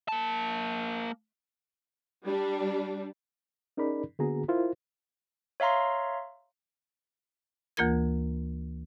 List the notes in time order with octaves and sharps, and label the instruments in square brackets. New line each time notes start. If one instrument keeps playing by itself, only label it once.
[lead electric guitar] A#3 A5
[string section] G3 D4
[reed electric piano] C#4 D#4 G#4 A#4 D5 B5
D3 A#3 B3 F#4 G#4 A#5
E4 F4 A#4 C5
[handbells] C#5 E5 F5 A#5 C6
[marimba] D2 E3 A#3 F4 A#4 G#6